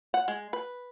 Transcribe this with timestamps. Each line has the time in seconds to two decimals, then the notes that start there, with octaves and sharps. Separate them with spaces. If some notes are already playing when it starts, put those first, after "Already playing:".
0.14 F#5
0.28 G#3
0.53 B4